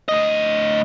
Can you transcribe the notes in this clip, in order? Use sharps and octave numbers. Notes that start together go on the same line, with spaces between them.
D2 D#5